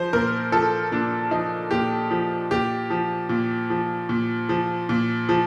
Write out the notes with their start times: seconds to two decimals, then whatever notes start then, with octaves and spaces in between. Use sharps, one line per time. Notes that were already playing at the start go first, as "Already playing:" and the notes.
Already playing: F3 C5
0.13 A#2 A#4
0.52 F3 A4
0.92 A#2 D4
1.31 F3 D#4
1.71 A#2 G4
2.11 F3
2.51 A#2 G4
2.90 F3
3.29 A#2
3.70 F3
4.09 A#2
4.49 F3
4.89 A#2
5.29 F3